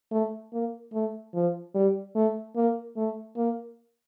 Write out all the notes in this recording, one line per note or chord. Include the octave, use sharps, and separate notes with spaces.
A3
A#3
A3
F3
G3
A3
A#3
A3
A#3